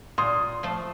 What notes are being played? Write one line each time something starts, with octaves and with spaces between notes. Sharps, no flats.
A#2 C6 D#6
F3 A3